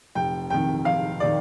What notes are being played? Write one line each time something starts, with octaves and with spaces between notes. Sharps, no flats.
F1 G5
F2 D#3 G5
F1 F5
D#3 D5